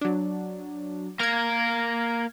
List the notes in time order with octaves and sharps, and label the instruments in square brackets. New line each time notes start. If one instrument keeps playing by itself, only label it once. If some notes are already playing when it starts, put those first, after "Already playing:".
[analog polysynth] F#3 D4
[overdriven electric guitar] A#3 A#4 [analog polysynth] F6 G#6